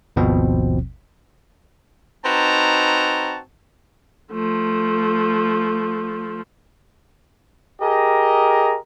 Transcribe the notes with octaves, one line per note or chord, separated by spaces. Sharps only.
G#1 D#2 B2 F3 C4
C4 D#4 F#4 B4 A5 A#5
F3 A3
G4 G#4 A#4 D#5